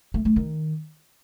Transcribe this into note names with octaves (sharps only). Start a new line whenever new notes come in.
A3
A3
D#3